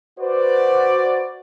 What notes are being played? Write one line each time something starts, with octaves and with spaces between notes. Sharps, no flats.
F#4 B4 C5 D5